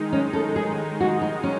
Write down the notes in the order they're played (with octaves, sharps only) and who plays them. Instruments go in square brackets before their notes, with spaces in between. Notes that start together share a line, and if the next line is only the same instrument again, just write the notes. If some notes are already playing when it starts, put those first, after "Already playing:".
Already playing: [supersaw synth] D#3 G#3 D#4
[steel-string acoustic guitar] C#4
A4
G#4
F#4
D#4
C#4